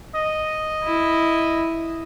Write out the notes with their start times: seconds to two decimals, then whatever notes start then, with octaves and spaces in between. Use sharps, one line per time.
0.15 D#5
0.84 E4